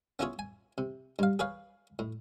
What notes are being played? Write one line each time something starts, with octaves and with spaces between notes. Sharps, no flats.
B3 C#4 E4 F4 G#4 C#5
G#5
C3
G2 F5
G#4 B4 C#5 F5
A2